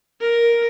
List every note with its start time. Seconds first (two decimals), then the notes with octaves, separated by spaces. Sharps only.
0.21 A#4